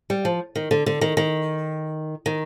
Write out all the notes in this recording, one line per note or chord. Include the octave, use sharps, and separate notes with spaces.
G3
F3
D#3
D3
D3
D#3
D#3
D#3